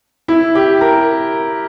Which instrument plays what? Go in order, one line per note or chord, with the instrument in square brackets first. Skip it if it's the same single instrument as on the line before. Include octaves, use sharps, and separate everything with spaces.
[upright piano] E4
G4
A#4